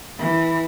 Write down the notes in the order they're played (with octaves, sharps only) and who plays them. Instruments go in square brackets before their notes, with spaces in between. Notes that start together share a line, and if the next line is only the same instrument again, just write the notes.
[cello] E3